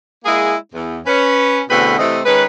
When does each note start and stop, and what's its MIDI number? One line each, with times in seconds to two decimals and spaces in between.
0.25 0.55 56
0.25 0.55 58
0.25 0.55 64
0.25 0.55 68
0.74 0.99 40
1.06 1.61 61
1.06 1.61 71
1.70 1.99 40
1.70 1.99 47
1.70 1.99 50
1.70 1.99 57
1.70 1.99 60
1.70 1.99 71
1.99 2.19 48
1.99 2.19 52
1.99 2.19 57
1.99 2.19 60
1.99 2.19 75
2.25 2.45 51
2.25 2.45 56
2.25 2.45 61
2.25 2.45 71